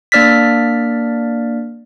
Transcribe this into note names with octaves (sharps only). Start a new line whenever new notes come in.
A#3 D4 D5 F6 A6 B6